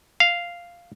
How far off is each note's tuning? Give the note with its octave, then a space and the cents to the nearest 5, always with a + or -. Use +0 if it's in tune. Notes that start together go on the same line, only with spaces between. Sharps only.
F5 -5